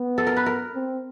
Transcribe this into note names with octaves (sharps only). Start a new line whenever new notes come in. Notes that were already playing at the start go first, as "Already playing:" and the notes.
Already playing: B3
A4
A#4
B4
A#4
C4